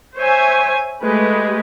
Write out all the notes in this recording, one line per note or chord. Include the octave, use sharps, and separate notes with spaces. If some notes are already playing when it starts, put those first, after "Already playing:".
C5 C#5 E5 G#5
G#3 A3 G4 B4